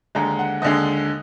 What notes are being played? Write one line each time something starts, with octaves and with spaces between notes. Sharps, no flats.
D#2 D3 G#3 A#5
F#5
D#2 D3 G#3 D#5